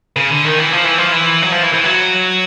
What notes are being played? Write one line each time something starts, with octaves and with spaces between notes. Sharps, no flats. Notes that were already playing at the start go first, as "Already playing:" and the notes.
C#3
D3
D#3
E3
F3
E3
F3
E3
F#3
F3
E3
E3
F#3